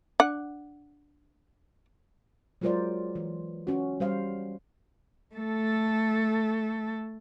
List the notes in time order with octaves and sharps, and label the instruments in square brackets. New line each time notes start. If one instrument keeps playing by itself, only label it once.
[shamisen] D4 F#5
[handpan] F#3 G#3 F4 A#4 C5 D5
E3
C#4 F#4
G3 C5 F5
[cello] A3 A4